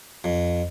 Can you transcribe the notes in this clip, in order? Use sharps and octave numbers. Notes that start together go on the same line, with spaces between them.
F2